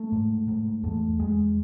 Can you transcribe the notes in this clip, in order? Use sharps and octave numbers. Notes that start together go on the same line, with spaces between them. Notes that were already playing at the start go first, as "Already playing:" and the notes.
Already playing: A3
G#2
G#2
E2 A3
E2 G#3